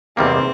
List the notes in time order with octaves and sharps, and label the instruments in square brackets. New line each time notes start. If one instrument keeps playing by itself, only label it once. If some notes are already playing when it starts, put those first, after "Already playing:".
[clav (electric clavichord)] E2 C3 D#3 G3 A#3 [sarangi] C4